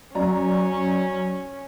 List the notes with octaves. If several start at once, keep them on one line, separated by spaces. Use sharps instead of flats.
F#2 C#4 D5 A#5